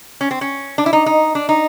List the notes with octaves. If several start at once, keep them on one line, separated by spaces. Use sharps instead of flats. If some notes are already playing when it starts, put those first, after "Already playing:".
C#4
C4
C#4
D4
E4
D#4
D#4
D4
D#4